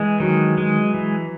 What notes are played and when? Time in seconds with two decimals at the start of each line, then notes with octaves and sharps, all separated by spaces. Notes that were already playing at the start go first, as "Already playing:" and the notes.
Already playing: E3 G#3
0.20 D#3 F#3
0.58 G#3
0.94 E3